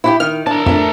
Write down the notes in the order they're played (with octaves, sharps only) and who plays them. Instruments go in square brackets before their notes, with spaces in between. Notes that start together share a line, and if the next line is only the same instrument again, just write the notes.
[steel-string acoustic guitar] E4 F#4 G4
[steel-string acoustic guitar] D#3 [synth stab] F6
[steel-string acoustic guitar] D4 [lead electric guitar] A#4 A5
[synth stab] F2 [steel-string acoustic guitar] A3 D4